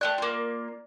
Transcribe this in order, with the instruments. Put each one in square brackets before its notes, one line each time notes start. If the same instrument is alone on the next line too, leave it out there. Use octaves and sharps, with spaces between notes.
[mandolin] A3 G4 F#6 [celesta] D5
[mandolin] A#3 F4